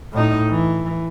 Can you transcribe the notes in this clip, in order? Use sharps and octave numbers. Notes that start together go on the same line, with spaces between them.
A2 D#4
E3